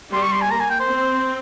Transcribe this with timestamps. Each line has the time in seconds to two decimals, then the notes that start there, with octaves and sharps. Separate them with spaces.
0.13 G3 C6
0.22 C#6
0.32 C6
0.42 G#5
0.51 A#3 A#5
0.60 G#5
0.70 G5
0.80 C5
0.90 C4